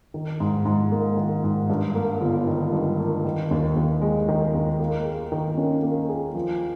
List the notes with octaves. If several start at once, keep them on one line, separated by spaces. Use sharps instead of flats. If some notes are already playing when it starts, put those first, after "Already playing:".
D#3
G#2
G#2
A#3
D#3
G#2
G2
A#3
G1
D#3
G2
A#3
D#3
D#2
D#2
G#3
D#3
D#2
A#3
G#4
D#3
C#4
A#3
G#4
F3